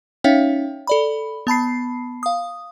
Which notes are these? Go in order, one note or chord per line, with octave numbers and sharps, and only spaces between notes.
C#4 D#4 C#5 E5 F5 G5
A4 D5 B5
B3 A5 B5 C7
F5 D#6